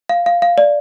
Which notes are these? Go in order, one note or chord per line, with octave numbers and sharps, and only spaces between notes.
F5
F5
F5
D5